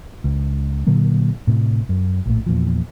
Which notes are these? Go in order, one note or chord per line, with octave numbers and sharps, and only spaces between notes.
C#2
A#2 D3 F#3 A#3
A2 C3
F#2
A#1 A2
E2 A#2 F3